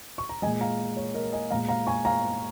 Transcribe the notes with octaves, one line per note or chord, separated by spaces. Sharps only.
C#6
A#5
A#2 G#3 D#5 G#5
F5 A#5
C#5
A#4 D#5
D#5 G#5
A#2 G#3 F5 A#5
F5 A#5
G#5 C#6
F5 A#5